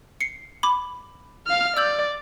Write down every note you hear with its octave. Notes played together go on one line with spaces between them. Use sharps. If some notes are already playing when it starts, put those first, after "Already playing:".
C7 C#7
B5 D6
F5 F6
D5 E6 G6 F#7